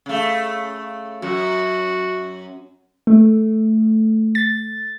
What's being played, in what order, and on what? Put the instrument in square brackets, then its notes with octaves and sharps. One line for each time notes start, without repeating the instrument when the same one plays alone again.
[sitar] C#3 A3
[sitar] F#2 [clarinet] F#4
[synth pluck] A3
A6